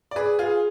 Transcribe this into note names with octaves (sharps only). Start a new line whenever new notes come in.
D5
G#4 B4
F4 G#4